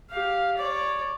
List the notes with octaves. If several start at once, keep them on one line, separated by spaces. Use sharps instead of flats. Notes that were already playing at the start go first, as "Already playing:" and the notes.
G4 F5
C#5 D5